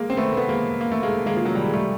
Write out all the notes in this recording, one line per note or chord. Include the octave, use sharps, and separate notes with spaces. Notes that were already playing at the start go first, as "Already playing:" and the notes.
Already playing: G#3 A#3
C4
A3 B3
B3
G#3 A#3
A#3
A3
G#3 A#3
G#3 A#3
F3
F#3
G3
G#3
G3 A3